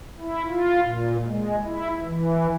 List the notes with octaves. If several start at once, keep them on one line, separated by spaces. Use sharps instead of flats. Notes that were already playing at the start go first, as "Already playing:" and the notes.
E4
F4
A#2
G#3
E4
E3